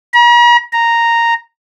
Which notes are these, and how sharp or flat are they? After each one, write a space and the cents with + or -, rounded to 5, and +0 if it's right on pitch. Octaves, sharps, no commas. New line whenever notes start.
A#5 +45
A#5 -5